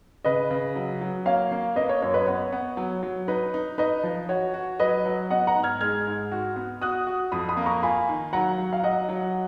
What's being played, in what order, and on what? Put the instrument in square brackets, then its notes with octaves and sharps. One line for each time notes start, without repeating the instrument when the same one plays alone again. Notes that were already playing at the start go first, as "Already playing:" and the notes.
[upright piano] C#3 [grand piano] B4 D#5
[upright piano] C#3
F#3
F#3
[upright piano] A#3 [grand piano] C#5 F5
[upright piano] A#3
[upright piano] A#3 [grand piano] B4 D#5
[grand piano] C#5
[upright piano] F#2 [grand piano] C#5
[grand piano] B4 D#5
[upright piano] B3 [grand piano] C#5
[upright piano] B3
F#3
F#3
[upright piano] D#4 [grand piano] B4
[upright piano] D#4
[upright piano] D#4 [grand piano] B4 D#5
[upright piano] F3
[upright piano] F#4 [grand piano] C#5
[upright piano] F#4
[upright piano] F#3 [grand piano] B4 D#5
[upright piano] F#3
[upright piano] B3 [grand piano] D#5 F#5
[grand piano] F#5 A#5
[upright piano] G#2
[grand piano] F6 G#6
[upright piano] G#3 [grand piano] F6 G#6
[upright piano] G#2
F#4
B3
[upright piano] F#4 [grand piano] D#6 F#6
[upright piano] F#4
[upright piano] F2 [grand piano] B5 D#6
[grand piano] B5 D#6
[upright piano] A#3
[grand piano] A#5 C#6
[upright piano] F4 [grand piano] G#5 B5
[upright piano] D#3
[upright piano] F#3 [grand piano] F#5 A#5
[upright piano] F#3
[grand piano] F5
[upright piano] F#3 [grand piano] D#5 F#5
[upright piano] F#3